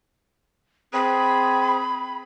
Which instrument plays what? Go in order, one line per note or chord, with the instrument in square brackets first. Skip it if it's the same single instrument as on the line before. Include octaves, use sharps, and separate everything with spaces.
[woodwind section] C4 G#4 [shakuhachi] B5